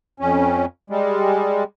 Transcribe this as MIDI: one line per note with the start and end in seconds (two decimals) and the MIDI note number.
0.20 0.65 41
0.20 0.65 61
0.90 1.64 55
0.90 1.64 56